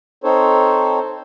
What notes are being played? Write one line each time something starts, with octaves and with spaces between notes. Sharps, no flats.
C4 D#4 A4 C5 C#5